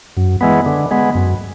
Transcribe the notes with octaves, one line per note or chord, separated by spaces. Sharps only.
F#2
E3 G#3 B3
D3
G#3 B3
F#2